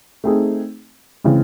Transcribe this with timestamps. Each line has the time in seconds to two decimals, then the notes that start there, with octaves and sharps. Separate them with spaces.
0.24 A3 C4 D#4 G#4
1.24 C#3 E3 G#3 C4